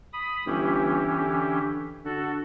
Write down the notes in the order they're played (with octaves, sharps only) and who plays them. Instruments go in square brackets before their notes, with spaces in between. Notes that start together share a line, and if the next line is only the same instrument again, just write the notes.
[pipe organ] B5 D#6
[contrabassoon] G1 [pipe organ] E3 C#4 G4
[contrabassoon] D3
[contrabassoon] D3 [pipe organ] F#4 A4